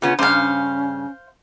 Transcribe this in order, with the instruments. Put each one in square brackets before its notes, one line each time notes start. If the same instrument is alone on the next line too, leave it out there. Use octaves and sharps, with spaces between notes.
[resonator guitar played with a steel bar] C#3 B3 C#4 [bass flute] F4
[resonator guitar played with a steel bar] G2 C#3 [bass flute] C#4 [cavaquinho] C5 F5